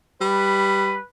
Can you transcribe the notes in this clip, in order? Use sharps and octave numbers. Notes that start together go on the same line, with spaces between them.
G3 B4